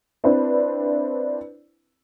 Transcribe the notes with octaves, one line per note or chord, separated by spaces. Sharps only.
C4 D4 E4 B4